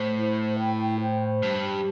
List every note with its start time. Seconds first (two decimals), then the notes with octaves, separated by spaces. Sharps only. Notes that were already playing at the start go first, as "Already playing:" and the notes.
Already playing: A2 C5
0.17 E4
0.59 G5
1.00 C5
1.42 G2 G4